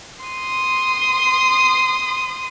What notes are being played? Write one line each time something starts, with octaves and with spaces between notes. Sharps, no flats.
C6 D#6